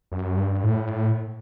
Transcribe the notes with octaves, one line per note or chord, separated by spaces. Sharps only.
F#2
G2
A2